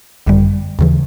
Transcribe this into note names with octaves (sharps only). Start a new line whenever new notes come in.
G#1 F#2 D3 G3
D#2 C#3 E3